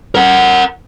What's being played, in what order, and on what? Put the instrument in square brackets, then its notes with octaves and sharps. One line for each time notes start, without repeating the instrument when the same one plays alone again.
[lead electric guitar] A#4 F#5